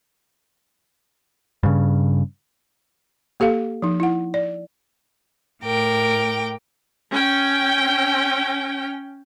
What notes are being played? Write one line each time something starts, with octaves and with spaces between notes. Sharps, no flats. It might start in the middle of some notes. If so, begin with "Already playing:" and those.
G2 C#3
A#3 G4 A4 F5
F3 D#4
E4 F#5
D5
A2 A#4 G5 D6
C#4 G5